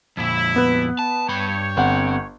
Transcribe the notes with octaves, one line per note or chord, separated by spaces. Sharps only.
F2 A#2 E4
B3 B4
A5
G2 C#5 G5 B5
G1 C4 F#5